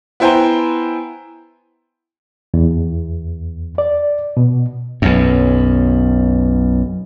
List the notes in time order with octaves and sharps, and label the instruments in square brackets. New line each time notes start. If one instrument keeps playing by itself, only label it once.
[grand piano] B3 E4 C5 G5 G#5 A#5
[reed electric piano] E2
D5
B2
[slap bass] B1 F#2